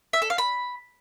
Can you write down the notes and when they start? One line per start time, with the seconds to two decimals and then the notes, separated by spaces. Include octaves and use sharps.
0.13 E5
0.22 A4
0.30 F5
0.38 B5